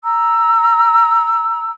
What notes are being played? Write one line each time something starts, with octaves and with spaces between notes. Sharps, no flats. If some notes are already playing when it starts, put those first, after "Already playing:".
A#5 E6